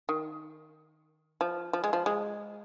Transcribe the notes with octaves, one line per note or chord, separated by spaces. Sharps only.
D#3
F3
F3
G#3
F3
G#3